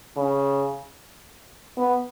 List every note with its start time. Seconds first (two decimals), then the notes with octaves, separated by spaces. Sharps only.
0.17 C#3
1.78 B3